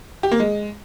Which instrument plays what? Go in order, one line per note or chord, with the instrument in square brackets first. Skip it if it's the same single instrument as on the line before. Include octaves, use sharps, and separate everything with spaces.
[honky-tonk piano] G4
A#3
G#3